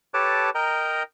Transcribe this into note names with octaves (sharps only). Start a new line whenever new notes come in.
G4 A4 B4 C#5 A5 D6
A#4 D#5 G5 A#5